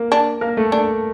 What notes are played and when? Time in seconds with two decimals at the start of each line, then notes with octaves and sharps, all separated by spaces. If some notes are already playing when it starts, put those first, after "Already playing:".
Already playing: A#3 A#4
0.12 D4
0.41 A#3 A#4
0.57 A3 A4
0.72 D4